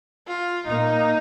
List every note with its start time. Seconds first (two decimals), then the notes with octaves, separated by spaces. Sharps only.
0.27 F4
0.66 A#2 A#3 D#4